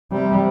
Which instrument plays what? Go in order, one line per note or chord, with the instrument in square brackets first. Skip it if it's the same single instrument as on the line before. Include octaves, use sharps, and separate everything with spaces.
[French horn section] C3 [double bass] G3